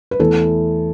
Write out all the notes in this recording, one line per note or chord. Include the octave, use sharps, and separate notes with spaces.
B4
E2 E3 A3 E4 A4